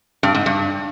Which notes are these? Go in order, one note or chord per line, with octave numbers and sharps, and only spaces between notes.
G2
G#2
G2